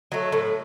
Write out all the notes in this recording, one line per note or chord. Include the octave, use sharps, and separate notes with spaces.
F#3 A3
A2